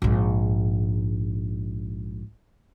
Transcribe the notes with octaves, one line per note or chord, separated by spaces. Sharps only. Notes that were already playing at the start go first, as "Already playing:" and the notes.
A#1 G#2